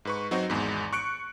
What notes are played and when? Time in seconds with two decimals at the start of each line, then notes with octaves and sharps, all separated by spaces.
0.05 G#2 B4 C#6
0.31 F#3 C4 D#4 F#4
0.50 G#1 E2 G#2
0.93 C#6 F#6 C#7 D7